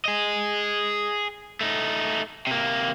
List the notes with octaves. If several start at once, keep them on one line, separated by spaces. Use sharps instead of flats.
G#4 D#5
A3 D#4
C3 A#3